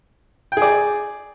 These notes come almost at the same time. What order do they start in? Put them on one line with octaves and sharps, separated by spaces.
G5 G#4 D5